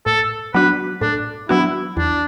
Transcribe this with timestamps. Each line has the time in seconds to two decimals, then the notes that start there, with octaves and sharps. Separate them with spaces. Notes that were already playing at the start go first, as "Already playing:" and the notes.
0.06 A2 A4
0.54 F#3 B3 D4 F#4 B4
1.01 A2 D4
1.49 F#3 B3 D4 E4 F#4
1.96 E2 D4